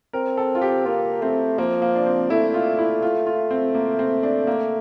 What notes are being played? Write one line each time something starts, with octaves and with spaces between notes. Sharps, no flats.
C4 A#4
A4
F4
G4
A#3 F4
A3 C4
F3 A#3
A#3
D4
C4
A3 E4
F4
E4
F4
F4
C4
A#3
C4
D4
A#3